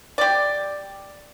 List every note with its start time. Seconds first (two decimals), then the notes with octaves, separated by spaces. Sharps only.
0.18 G4 D5